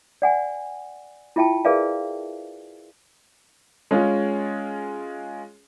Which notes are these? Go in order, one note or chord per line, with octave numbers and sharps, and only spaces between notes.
D5 F#5 G#5
E4 F4 E5 G5 A5
G#4 A#4 B4 D5 E5 F5
G#3 C#4 F4 G#4